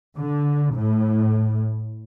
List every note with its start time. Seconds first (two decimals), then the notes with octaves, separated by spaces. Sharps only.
0.17 D3
0.75 A2